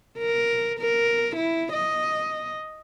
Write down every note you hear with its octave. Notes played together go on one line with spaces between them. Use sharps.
A#4
A#4
E4
D#5